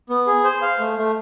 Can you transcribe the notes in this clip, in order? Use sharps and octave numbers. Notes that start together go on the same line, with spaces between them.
B3
G#4
C5
F5
A3
A3